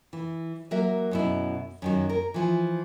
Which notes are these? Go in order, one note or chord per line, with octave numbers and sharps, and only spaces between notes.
E3
F#3 A#3 A#4 E5
F#2 B2 E4
F#2 D#3 F#3
A#4
E3 F3 G#5